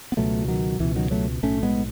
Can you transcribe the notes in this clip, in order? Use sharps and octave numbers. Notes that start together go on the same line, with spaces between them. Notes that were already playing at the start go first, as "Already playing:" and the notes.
B3
C#2 B2 F#3 A3
E3
D#3 F#3
C#2 B2 E3
D#3 F#3
F#3 A3
B1 A2 A3 C#4
G#3 B3